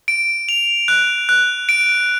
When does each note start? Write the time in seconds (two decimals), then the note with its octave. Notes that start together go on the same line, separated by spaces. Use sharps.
0.08 D7
0.49 F7
0.88 F#6
1.29 F#6
1.69 D7